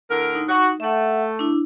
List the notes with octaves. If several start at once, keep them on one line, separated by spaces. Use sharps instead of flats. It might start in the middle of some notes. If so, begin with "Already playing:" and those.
A2 D3 A#4
D#4
F#4
A3 E5 F#5
D4 E4